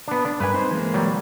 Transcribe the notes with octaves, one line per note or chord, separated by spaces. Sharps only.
B3 D4
D4
G2 A#4 B4 G#5
C4 D#4 C5
E3 G#3 A#3
F#3 G3